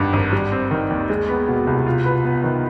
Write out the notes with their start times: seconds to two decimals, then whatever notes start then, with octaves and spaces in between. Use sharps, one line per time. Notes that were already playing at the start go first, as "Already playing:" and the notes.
Already playing: G#1 G2 D#3
0.13 G#1
0.33 G3
0.52 C4
0.71 D#3
0.90 D#2
1.10 G#3
1.29 B3
1.48 B2
1.67 C2
1.86 F4
2.06 B4
2.25 B3
2.44 D#3